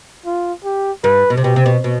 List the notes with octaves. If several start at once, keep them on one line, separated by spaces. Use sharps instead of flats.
F4
G4
G2 B4
B2
C3
B2 G4
C3
B2
B2